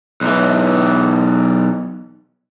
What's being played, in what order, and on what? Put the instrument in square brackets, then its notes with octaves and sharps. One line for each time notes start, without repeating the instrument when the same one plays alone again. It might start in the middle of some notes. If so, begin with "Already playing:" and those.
[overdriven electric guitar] B1 E3